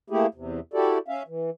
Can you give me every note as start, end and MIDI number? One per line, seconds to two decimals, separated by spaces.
0.10 0.26 57
0.10 0.26 58
0.10 0.26 64
0.10 0.26 67
0.10 0.26 68
0.34 0.60 40
0.34 0.60 48
0.74 0.98 64
0.74 0.98 66
0.74 0.98 67
0.74 0.98 69
0.74 0.98 74
1.08 1.23 61
1.08 1.23 76
1.08 1.23 77
1.28 1.50 52